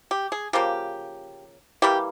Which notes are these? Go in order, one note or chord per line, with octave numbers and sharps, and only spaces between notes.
G4
G#4
C#3 F3 A#3 G4
E3 G3 A#3 G4